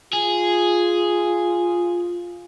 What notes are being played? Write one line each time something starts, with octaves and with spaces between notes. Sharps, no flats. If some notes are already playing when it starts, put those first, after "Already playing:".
F4 G#4